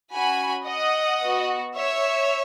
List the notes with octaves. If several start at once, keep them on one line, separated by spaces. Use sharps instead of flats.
C#4 F#4 G#5 B5
D#5 F#5
B3 F#4
C#5 E5